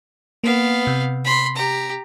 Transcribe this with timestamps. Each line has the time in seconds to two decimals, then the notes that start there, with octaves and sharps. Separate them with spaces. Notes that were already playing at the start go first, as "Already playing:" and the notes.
0.44 A#3 B3 F5
0.87 C3
1.24 B5 C6
1.56 G4 A#5